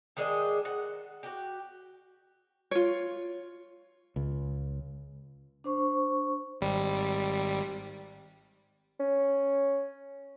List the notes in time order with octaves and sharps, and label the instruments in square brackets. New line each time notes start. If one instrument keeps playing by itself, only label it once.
[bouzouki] D#3 G#3 D4 D#5
F#5
F#4 G4
[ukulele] F4 C#5
[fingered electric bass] C#2
[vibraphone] D4 C5 C#6
[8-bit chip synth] G#1 G3
[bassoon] C#4